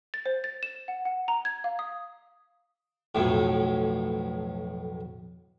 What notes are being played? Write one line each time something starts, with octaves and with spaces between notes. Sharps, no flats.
A6
C5
A6
E7
F#5
F#5
A#5
G#6
F5
D#6
B1 F2 A2